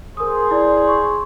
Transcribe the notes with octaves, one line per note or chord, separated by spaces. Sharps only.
G#4 A#4 C5 D#6
E4 D5
C#6